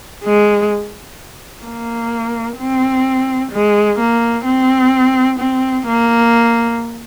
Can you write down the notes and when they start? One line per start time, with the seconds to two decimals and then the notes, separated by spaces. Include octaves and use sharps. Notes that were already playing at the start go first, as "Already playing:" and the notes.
0.24 G#3
1.64 A#3
2.58 C4
3.52 G#3
3.99 A#3
4.45 C4
5.39 C4
5.86 A#3